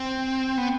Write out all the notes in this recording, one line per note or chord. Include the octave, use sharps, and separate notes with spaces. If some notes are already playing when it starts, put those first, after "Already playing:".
Already playing: C4
B3